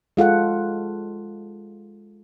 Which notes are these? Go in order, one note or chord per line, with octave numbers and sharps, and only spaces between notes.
G#3 F4 A4 F#5